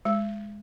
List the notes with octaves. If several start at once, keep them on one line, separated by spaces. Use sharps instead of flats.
G#3